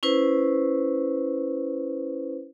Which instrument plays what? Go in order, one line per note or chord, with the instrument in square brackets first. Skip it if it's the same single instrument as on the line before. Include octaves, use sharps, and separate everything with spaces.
[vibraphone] C#4 E4 B4 C5